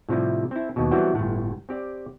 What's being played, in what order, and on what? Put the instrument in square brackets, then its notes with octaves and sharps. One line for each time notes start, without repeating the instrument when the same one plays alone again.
[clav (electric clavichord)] A2 C3 F3 G3 E4
C4 E4
D#2 B2
E3 F#3 G3 B3 C4 F#4
G1 A2
C4 G4 D5